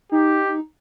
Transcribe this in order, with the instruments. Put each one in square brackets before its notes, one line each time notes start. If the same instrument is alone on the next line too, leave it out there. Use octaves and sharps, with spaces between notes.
[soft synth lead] D#4 [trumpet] G4